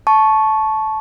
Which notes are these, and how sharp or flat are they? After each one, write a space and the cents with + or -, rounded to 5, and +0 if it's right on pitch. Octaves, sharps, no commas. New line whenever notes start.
A5 -15 C#6 +0